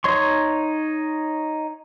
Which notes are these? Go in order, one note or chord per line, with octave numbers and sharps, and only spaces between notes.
D#4 C#5 C6 C#6